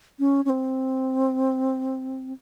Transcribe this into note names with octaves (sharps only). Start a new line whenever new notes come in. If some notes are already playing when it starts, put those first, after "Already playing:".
C#4
C#4
C4